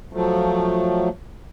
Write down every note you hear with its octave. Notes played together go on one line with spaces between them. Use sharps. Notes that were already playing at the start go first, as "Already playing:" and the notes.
F3 F#3 A3